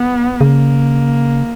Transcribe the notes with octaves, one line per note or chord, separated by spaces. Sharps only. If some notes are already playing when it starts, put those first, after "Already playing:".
Already playing: B3
C#3 A#3